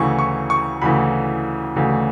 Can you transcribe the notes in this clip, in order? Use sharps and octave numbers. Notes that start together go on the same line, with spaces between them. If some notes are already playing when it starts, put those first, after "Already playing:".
Already playing: D2 C#3 E3 C#6
C#6
C#6
D2 C#3 E3 B5
D2 C#3 E3